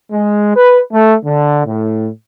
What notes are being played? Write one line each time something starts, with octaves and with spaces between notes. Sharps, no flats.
G#3
B4
A3
D3
A2